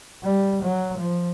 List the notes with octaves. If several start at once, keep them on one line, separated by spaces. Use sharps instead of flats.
G3
F#3
F3